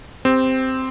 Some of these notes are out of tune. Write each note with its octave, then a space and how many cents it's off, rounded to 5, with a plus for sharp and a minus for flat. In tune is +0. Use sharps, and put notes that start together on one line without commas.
C4 -5 G4 +20